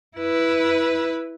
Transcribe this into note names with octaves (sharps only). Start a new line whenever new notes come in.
E4 B4